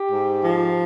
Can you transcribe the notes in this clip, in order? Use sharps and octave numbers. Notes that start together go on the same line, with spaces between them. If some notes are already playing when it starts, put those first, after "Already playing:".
Already playing: G4
G#2
F3